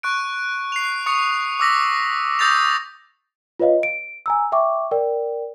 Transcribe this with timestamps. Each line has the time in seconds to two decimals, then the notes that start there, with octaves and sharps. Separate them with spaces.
0.03 C#6 F#6 D7
0.72 C7 F7
1.06 C#6 D#6 C#7
1.60 D6 E6 A#6 B6
2.39 D#6 E6 G6 A6 A#6 F7
3.60 F4 B4 C#5 D#5 F5
3.83 D7
4.26 G#5 A#5 E6
4.52 E5 G5 C#6 D6
4.91 A#4 D5 G5